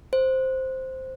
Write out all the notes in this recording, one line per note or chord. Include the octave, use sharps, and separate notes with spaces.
C5